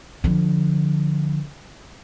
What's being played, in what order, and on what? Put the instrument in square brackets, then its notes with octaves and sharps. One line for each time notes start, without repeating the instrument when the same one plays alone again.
[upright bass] D3 F3